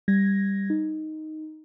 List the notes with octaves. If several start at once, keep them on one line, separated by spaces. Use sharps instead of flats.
G3 G#6 A#6
D#4